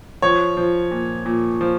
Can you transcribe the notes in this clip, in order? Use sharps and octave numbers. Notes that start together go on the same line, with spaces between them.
F3 C#5
F3
A#2
A#2
F3